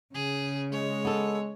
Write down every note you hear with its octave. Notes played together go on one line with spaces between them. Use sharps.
C#3 G#4
G#3 C#5
B3 A4